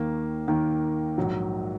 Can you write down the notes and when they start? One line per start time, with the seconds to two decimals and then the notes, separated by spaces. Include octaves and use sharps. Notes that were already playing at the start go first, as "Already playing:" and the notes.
Already playing: D#2 D#3 A#3
0.48 D#2 D#3 A#3
1.18 A#1 G#2 F#3